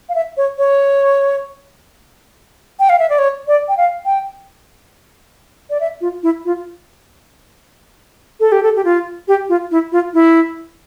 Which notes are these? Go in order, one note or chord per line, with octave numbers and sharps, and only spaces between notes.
F5
E5
C#5
C#5
G5
F5
E5
D5
C#5
D5
G5
F5
G5
D5
E5
F4
E4
F4
A4
G4
A4
G4
F4
G4
F4
E4
F4
E4